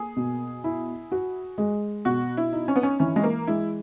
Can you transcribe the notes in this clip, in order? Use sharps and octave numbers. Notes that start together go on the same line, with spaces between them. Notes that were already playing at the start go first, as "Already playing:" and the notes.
Already playing: A#3 G#4
B2
E4
F#4
G#3
B2 F#4
E4
D#4
C#4
B3
C#4
E3 C#4
G#3
A#3
G#3 E4